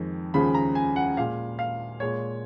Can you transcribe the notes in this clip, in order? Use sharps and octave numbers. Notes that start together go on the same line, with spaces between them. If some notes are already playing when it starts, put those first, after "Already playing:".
Already playing: F2 D#3 G#3
D#2 C#3 F3 G#3 B5
A#5
G#5
F#5
A#2 G#3 F5
F5
A#2 G#3 C#5